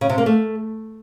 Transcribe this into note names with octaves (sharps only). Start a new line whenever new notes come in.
C#3
C3
A#3
A3